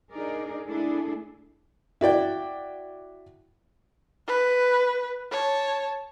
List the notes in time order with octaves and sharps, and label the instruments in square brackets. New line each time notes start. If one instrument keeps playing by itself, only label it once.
[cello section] D4 D#4 G#4 A#4 D5
A3 D4 E4 G#4 A4
[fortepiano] E4 F#4 D5 G5
[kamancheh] B4
C#5 A5